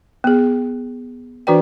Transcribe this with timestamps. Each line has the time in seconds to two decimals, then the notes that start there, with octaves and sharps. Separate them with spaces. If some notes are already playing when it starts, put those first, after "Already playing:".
0.24 B3 G#4
1.47 E3 D4 F#4 B4 D5 G5